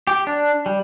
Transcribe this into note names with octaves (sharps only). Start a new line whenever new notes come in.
G4
D4
G3